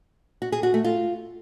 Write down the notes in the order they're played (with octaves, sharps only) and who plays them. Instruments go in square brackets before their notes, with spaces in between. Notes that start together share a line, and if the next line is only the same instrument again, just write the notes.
[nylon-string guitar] F#4
G#4
F#4
A3
F4